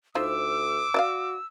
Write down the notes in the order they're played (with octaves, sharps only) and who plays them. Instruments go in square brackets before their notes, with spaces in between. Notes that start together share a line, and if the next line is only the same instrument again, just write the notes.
[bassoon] D2 [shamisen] D#4 F4 C5 [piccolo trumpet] D6 [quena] E6
[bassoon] F#4 [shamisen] D5 E5 F5